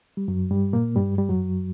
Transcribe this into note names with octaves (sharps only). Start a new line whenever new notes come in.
G3
F#2 F#3
G2 G3
A#2 A#3
G2 G3
G3
F#2 F#3